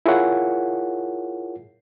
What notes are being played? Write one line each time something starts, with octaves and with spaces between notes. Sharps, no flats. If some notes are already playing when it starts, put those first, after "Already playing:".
E4 F4 G#4 A#4 C#5 F#5